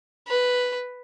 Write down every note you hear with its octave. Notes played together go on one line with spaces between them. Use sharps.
B4